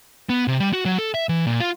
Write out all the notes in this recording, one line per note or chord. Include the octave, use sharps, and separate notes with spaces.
B3
C3
G3
F#4
F#3
A4
E5
E3
A#2
F4